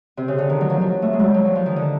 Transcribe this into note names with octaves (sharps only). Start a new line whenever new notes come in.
C3
C#3
D3
D#3
F#3
F3
F#3
A3
G#3
F#3 G3
F#3
F3
F3
D#3
D3